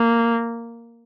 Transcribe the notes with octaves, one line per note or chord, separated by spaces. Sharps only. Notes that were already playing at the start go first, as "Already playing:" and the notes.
Already playing: A#3